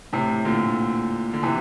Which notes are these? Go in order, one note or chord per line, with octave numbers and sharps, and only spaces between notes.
A2 C3
A#2 D3
D3
C3 E3